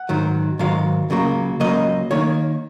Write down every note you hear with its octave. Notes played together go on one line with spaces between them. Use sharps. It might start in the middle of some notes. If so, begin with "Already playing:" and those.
Already playing: F#5
G#2 D#3 F#3
G#2 D#3 F#3 F5
C#2 C#3 F#3 A#3
C#2 C#3 F#3 A#3 D#5
D#3 A#3 C#5